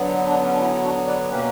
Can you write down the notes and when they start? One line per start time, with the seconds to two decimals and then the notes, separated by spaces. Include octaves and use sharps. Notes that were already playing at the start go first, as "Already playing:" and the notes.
Already playing: D3 F#3 B3
0.25 D4
0.43 C#4
0.51 D4
0.59 C#4 E4
0.83 D4 F#4
1.06 B4 D5
1.28 B2 A#3 C#4 G4 B4